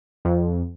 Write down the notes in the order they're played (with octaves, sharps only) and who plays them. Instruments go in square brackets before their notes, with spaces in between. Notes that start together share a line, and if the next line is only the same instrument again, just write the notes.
[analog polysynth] F2